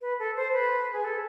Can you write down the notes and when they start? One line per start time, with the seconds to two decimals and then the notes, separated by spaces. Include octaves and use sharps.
0.01 B4
0.19 A4
0.36 C5
0.52 B4
0.93 G#4
1.04 A4